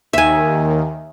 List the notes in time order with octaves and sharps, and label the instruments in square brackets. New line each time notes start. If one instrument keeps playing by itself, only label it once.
[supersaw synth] D#2 D#3 [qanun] E5 G#5